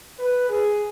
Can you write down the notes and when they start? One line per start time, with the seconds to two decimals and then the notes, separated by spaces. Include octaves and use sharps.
0.19 B4
0.49 G#4